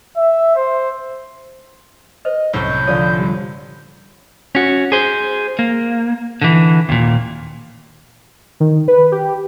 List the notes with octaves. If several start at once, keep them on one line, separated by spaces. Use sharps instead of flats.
E5
C5
B4 C5 D#5
C2 F#2 A2 G6
D3 F3 C#5 D5 F5 D#6
G3
C#4 F#4
G#4 C5
A#3
D3 E3
D#2 A#2
D#3
B4
G4